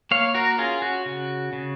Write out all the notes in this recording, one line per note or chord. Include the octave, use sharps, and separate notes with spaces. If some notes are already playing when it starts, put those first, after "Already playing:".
A#3 C#5 F5
F#4 A#4
C#4 F4 G#4
F#4
C#3
C#3